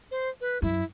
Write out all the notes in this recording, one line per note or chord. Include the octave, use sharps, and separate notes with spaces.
C5
B4
F#2 E4